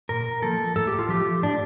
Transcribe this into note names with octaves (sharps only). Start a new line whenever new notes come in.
A#2 A#4
F3 A#3 A4
A2 A4
G4
F4
F3 A3 G4
A2 D4